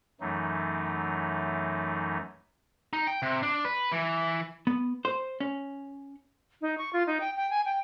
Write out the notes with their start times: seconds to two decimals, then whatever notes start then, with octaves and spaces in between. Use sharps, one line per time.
0.21 F#2 E3 F#3 A3 D#4
2.93 D#4
3.07 G5
3.22 C3
3.43 D4
3.65 B4
3.92 E3
4.67 B3
5.05 C5
5.40 C#4
6.61 D#4
6.78 C#6
6.93 F4
7.07 D#4
7.21 G5
7.37 G5
7.50 G#5
7.65 G5